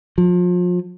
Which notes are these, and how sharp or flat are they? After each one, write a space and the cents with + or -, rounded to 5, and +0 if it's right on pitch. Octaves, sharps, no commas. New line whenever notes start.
F3 +35